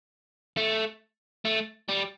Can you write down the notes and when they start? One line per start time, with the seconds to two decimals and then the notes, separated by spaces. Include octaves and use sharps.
0.57 A3
1.45 A3
1.89 G3